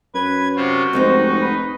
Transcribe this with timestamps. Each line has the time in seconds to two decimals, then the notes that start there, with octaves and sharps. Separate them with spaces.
0.14 F#2 B4 G#6
0.56 C3 C4 F4 F#4
0.93 F1 G#2 G#3 C4 D#4
1.41 B4